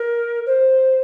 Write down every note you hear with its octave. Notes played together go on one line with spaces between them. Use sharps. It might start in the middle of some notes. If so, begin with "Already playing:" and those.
Already playing: A#4
C5